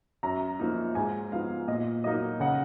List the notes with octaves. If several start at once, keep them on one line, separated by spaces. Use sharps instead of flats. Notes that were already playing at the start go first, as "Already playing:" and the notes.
F#2 A#5
F3 A#3 D#4
G#2 G#5
F3 B3 D#4 F5
A#2 D#5
F#3 A#3 D#4 D#5
C#3 F#5